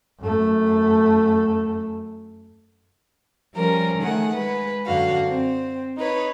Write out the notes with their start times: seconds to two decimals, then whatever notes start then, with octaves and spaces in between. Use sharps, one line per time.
0.20 F#2 A3
3.55 F3 G3 C#4 A#4
3.99 D#3 A3 G#4 F#5
4.33 G#3 B4
4.85 F#2 D3 F#4 F5
5.28 C4
5.97 D#4 B4 C#5